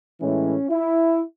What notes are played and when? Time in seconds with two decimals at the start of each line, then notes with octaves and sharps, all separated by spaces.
0.21 A2 E3 G#3 C#4
0.70 E4